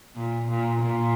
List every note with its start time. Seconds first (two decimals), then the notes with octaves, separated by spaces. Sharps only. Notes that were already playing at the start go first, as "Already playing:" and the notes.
0.15 A#2
0.48 A#2
0.81 A#2